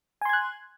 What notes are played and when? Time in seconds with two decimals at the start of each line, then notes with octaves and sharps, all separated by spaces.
0.21 G#5
0.25 C6
0.29 G#6
0.33 F#6